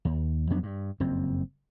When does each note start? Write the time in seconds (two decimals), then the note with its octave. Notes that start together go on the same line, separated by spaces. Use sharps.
0.05 D#2
0.50 F2 F#3 B3 D4
0.63 G2
1.00 F#1 F2 C4